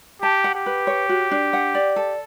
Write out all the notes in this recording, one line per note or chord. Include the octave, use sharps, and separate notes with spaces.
G4 A5
F#5
G4
B4
C#5
F#4
D4
F#5
D5
A4